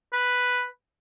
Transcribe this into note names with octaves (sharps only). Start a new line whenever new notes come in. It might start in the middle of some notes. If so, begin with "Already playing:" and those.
B4